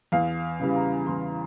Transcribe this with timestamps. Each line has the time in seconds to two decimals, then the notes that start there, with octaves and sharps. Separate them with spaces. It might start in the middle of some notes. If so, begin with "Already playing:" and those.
0.12 E2 F5
0.60 C#3 E3 G3
0.76 A#5
1.07 E2 C6